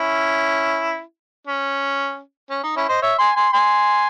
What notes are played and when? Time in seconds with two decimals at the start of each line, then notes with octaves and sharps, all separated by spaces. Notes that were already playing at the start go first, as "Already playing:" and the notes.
Already playing: C#4 E4
1.47 C#4
2.50 C#4
2.63 D#4
2.76 C#4 E4
2.89 C5 D#5
3.02 C#5 E5
3.19 G#5 C6
3.36 G#5 C6
3.53 G#5 C6